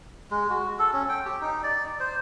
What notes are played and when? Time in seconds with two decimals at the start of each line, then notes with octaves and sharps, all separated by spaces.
0.31 G#3
0.50 F#4
0.79 A4
0.94 C#4
1.09 G5
1.25 G4
1.41 D#4
1.63 D5
2.00 C5